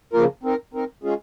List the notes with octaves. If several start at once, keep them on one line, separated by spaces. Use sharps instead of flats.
C#3 F3 A#3 F4 A#4
C4 D#4 A#4
C4 D#4 A#4
G#3 C#4 F4 G#4